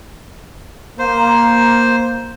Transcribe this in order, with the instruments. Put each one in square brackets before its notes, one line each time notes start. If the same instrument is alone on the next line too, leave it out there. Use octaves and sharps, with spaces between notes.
[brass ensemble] A#3 [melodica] C5